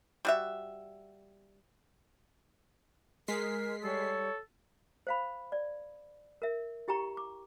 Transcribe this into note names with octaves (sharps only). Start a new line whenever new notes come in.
G3 F#4 E5
G#3 A#4 B6 C7
G3 A4 C#5
C5 F5 B5
D5
A#4 E5
E4 G4 G5 A#5 C#6
D6